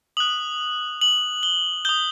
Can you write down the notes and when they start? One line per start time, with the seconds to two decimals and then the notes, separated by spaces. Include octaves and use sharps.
0.17 D#6 F#6 F#7
1.01 F#7
1.43 G7
1.85 D#6 G6 G7